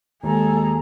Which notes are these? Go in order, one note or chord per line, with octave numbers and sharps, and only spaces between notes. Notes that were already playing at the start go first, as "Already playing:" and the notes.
D#2 G#3 G#4 A4 A#5